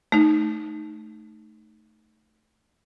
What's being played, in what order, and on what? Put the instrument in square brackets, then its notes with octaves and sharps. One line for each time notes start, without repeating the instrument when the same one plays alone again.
[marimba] A3 D#4